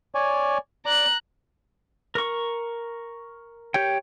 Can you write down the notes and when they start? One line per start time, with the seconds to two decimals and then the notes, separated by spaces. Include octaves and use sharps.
0.15 C#5 D5 G#5
0.86 D5 A#5 D6 F#6
2.15 A#4 C#6
3.74 G4 C#5 G5